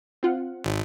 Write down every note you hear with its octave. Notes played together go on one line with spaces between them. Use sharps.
C4 F4 F#5
G#1